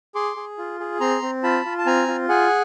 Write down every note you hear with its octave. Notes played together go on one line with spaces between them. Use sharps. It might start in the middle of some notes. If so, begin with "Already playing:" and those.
G#4 C6 D6
G#4
F4
G#4
C4 A#5 C6
C4
F4 A5 B5
F4
A5
C4 G#5 A#5
F4
G#4 F#5 G#5